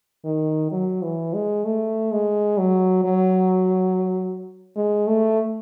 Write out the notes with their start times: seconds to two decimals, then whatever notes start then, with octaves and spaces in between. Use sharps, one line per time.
0.25 D#3
0.72 F#3
1.02 E3
1.34 G#3
1.65 A3
2.12 G#3
2.58 F#3
3.05 F#3
4.76 G#3
5.07 A3